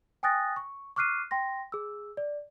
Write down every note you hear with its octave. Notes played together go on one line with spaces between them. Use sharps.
G5 G#5 D#6 F#6 A6 A#6
C#6
C#6 D6 F6 F#6 C7 D#7
G5 C6 A#6
G#4 E6
D5